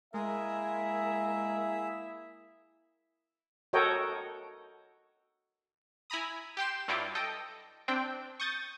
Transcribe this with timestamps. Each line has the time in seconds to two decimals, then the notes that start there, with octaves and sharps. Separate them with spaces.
0.14 G#3 A#3 E4 G#4 A#4 E5 G#5
3.73 F#4 A4 A#4 C#5 D#5 G5
6.10 E4 G#5 A#5 B5 D#6
6.57 G4 G5 C6 E7
6.88 G2 F#3 G3 E4 F4 D6
7.15 A4 D#5 G5
7.88 C4 D4 G5
8.40 C#6 D#6 G6 A6